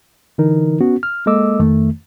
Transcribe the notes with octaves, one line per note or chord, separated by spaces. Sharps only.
D3 E3 D#4 A#4
B3 C#4 F#4
F6
G#3 A#3 A4 D#5 D6 E6
F2 D#3 A3